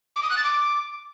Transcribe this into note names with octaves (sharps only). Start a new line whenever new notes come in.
D6
D#6
F#6
A6
D6